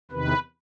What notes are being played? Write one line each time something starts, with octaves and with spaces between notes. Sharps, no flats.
E2 C3 D#3 B4